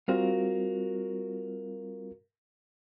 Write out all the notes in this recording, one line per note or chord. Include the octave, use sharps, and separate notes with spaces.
G3 C4 F4 F#4 A#4 F5